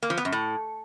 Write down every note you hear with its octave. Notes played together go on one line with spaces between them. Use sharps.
A#3
F3
B3
F#2
A2